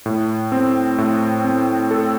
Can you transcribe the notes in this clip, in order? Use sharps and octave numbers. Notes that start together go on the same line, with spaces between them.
A2
C4
A2
C4
A4